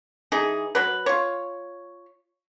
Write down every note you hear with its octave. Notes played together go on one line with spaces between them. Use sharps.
E3 D#4 G#4
F#3 B4
F4 C#5